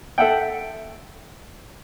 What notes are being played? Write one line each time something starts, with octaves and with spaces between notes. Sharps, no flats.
A4 E5 F#5 G5